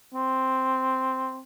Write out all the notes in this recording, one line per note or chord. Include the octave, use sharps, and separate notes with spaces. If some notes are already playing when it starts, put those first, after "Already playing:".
C4